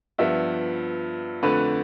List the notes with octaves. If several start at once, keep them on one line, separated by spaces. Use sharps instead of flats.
G2 F3 B3 E5
F2 D3 A3 B4